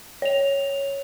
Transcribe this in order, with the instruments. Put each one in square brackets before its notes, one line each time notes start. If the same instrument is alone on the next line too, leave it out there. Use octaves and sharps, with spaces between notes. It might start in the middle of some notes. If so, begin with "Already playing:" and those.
[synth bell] C#5 F7